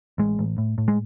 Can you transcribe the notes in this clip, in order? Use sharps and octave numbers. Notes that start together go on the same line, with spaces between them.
A1 G#3
A1
A2
A2
G#3